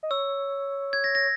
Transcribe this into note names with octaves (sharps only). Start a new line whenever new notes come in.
D#5
C#5 E6
G#6
A#6
A#6